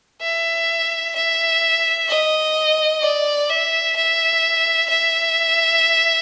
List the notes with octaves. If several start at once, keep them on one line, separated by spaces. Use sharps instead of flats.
E5
E5
D#5
D5
E5
E5
E5